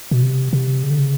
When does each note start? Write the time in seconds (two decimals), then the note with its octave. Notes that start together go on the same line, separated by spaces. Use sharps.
0.11 B2
0.22 C3
0.53 C3
0.83 C#3
0.90 D3
0.99 C#3